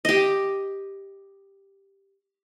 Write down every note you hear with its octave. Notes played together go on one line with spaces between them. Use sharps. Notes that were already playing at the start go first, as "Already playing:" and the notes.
G4 D#5